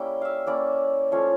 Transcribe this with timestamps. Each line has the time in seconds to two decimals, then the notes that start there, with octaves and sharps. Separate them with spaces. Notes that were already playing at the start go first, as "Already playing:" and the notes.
Already playing: G3 A#3 C#4 E4 G5
0.21 E5 F5
0.47 A#3 C#4 E4 D5
1.12 F3 A3 C#4 F4 C#5